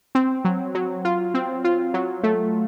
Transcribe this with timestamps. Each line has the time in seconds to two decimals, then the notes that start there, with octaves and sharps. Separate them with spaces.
0.15 C4
0.45 F#3
0.75 F#3
1.05 F4
1.34 C4
1.64 F4
1.94 F#3
2.23 A3